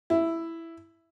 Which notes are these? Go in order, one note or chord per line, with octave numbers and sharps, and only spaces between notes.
E4